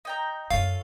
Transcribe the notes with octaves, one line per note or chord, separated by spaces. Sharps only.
D#4 G5 A#5
F#2 C#4 F4 A4 C#5 F5